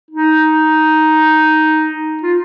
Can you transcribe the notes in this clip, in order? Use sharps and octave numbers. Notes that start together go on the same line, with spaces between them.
D#4
F4